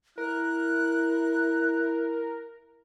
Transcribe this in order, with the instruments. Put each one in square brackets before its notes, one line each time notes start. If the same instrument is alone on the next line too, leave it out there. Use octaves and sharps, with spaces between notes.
[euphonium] E4 [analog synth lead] A#4 [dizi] F#6